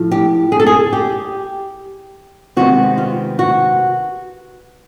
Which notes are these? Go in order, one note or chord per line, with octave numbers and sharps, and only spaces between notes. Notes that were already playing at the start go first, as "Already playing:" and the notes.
Already playing: A2 F3
G4
G#4
A4
G#4
G4
C3 D#3 G#3 B3 F#4
F4
F#4